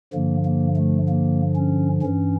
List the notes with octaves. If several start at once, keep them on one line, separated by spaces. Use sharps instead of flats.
G2 D3 F3 A#3
A#3
A3
A#3
C#4
G2 E3 C#4